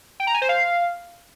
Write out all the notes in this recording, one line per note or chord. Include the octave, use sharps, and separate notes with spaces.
G5
A#5
G#5
C5
F5